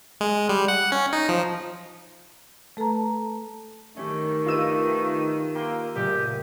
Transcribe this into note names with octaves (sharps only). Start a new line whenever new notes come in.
G#3
G3
F#5
C#4
D#4
F3
A3 A4 B4 A5 A#5
D#3 A3 C#4 G4
D4 F4 G4 B4 E6 D#7
A#3 G5 C6
F#1 A#2 A3 G4